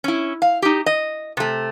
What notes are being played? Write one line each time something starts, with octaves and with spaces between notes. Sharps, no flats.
C#4 E4
F5
D#4 G4
D#5
C3 A3